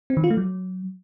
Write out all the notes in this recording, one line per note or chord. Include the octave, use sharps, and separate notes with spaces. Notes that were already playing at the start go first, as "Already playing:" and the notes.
C4
D#3
F4
A3
F#3